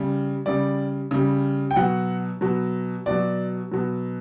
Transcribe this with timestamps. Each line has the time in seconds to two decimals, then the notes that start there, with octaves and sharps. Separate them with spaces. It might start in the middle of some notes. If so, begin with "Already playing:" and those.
Already playing: C#3 G3
0.46 C#3 G3 D5
1.11 C#3 G3
1.71 G5
1.76 B2 F#3 F#5
2.41 B2 F#3
3.06 B2 F#3 D5
3.71 B2 F#3